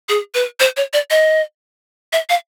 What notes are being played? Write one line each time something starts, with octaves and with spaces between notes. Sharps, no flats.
G#4
B4
C5
C#5
D5
D#5
E5
F5